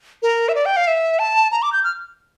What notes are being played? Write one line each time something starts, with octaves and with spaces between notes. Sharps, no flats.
A#4
E5
D5
G5
F5
E5
A5
A#5
D6
G6
F6